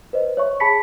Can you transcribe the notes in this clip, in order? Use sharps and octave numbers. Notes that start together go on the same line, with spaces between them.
B4 C5 D#5
C#5 E5 C#6
G#4 A5 B5 B6 C#7